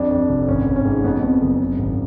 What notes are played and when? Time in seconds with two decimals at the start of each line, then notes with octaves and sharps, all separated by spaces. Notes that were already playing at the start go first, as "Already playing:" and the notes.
Already playing: F2 D4
0.11 F2
0.29 F1
0.48 G#1 C#4
0.66 G#1
0.76 C#4
0.85 G#2
1.04 F2 B3
1.23 F2
1.41 F#1
1.60 F#2
1.79 G#1